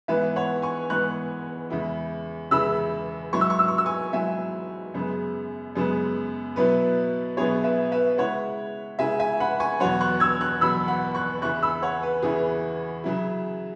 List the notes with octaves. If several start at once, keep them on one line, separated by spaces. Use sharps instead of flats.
G#2 E3 B3 B4 E5
C#5 F#5
G#5 C#6
G#2 E3 B3 C#6 F#6
E2 C#3 G#3 E4
E2 C#3 G#3 E4 B5 E6
G#2 F#3 E4 C#6
E6
C#6
E6
C#6
E6
G#5 C#6
G#2 F#3 E4 E5 G#5
F#2 C#3 G#3 B3
F#2 C#3 G#3 B3
B2 F#3 B3 E4 B4
B2 F#3 B3 E4 G#4 C#5
B4 E5
B4 E5
C#3 G#3 E4 C#5 F#5
C#3 G#3 E4 E5 G#5
E5 G#5
F#5 B5
G#5 C#6
E2 B2 F#3 C#5 F#5
C#6 F#6
E6 G#6
C#6 F#6
E2 B2 F#3 B5 E6
F#5 B5
C#6 F#6
E2 C#3 E3 C#4 E4 C#6 F#6
B5 E6
C#5 F#5
B4
E2 C#3 E3 C#4 E4 G#4
C#3 F#3 E4